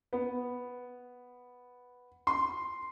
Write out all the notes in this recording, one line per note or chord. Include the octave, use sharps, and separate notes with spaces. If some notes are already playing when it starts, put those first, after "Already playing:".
B3
C6